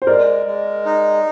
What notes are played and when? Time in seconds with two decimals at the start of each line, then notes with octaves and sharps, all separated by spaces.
0.02 C5
0.07 G#3 A#4 D5
0.46 G#3
0.85 D#4